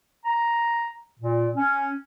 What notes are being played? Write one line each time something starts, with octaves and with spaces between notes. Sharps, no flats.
A#5
A#2
C#4